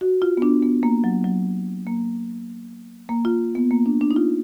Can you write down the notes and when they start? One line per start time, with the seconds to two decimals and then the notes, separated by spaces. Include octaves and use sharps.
0.01 F#4
0.22 F4
0.37 B3
0.42 D4
0.63 B3
0.83 A#3
1.04 F#3
1.24 F#3
1.86 A#3
3.09 A#3
3.25 F4
3.55 B3
3.71 A#3
3.86 D4
4.01 D4
4.11 D#4
4.16 F4